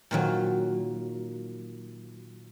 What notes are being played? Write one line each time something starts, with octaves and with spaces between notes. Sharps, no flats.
A#2 D#3 F#3